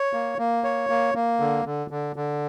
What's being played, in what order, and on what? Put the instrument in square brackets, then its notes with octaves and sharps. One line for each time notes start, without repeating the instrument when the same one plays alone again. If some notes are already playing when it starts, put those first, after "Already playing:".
Already playing: [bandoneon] C#5
A#3
A#3
C#5
A#3
A#3
D3
D3
D3
D3